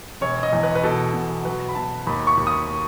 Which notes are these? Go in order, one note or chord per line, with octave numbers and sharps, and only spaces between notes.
E1 C#5
D#5
E2
B4
B4
B2 A4
B2
F#3 B4
B5
B2 A5
D#2 B5
C#6
D#2
D#6